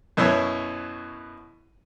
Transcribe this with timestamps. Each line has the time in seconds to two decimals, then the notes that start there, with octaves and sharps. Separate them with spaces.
0.17 F#2 B2 E4 C#5